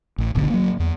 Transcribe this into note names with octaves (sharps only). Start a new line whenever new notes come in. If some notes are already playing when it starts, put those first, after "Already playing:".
A1
D1 G#1 B2 D3
F#3 A#3
E2